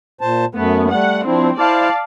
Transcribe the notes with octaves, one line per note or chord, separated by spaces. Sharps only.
A#2 C5 A5
F#2 A3 B3
G3 A3 F#5
F3 C4 D4 E4
E4 C5 D5 F5 A5